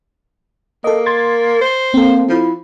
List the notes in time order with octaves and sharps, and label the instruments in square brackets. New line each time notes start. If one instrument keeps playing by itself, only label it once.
[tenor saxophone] A#3 [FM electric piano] A4 D#5
[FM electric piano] C6 G#6 A6
[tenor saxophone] C5
[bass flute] A#3 [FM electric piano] C4 A4
[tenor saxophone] F3 [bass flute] E4